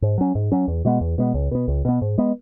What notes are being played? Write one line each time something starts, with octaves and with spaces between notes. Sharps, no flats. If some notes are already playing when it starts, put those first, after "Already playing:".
G#2
F#3 C#4
G#2
F#3 C#4
E2
B2 G#3 B3
E2
B2 G#3 B3
C#2
B2 B3
C#2
B2 B3
G#2
G#3 B3